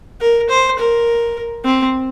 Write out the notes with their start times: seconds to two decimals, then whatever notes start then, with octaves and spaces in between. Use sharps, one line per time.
0.21 A#4
0.49 C5
0.79 A#4
1.64 C4